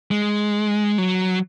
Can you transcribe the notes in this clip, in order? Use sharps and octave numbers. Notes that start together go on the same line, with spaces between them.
G#3
F#3